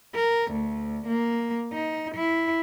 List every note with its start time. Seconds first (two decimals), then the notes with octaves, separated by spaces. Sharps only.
0.14 A#4
0.52 D2
1.07 A#3
1.73 D#4
2.15 E4